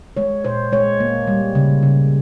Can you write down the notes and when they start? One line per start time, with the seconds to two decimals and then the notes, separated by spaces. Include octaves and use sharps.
0.17 G#3 C#5
0.45 A#2 C5
0.72 G#3 C#5
1.00 A#3
1.27 G3
1.55 C#3
1.83 C#3